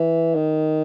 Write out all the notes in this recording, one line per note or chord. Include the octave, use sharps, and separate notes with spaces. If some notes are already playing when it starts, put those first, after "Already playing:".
Already playing: E3
D#3